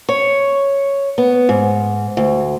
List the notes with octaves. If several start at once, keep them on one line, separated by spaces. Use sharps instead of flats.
C#5
B3
G#2
D2